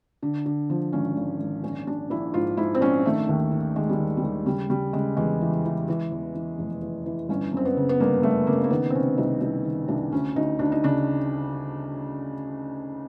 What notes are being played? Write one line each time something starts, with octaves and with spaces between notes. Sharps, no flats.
D3
D3
F3
G#1 C#4
G#1
G#1
A#1 C#4
A#1 D4
A#1 E4
G#2 F4
G#2 E4
C4
A#1 C#4
D#3 A3
D#2
D#3
D#3 G#3
G3
D#2
G3
D#2
C#3 G3
C#3 G3
C#3 G#3
E2 G#3
E3
E3
E3
E2
E3
F1
E3
E3
G1 C#4
F#2 C4
B3
C#3
B3
G1 A#3
G1 A3
C#3 A#3
A#3
D#3 B3
C4
C3 C#4
C2 D#4
C2 D#4
D#3
C2 D4
D2 C#4
D2 D#4
D2 D4
D#4
C#3 D4